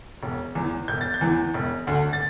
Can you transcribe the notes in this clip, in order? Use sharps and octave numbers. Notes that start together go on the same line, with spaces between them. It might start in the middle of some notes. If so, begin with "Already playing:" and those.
E1
E2 E3
E1 G6
A6
G6
E2 E3
E1
D2 D3
A6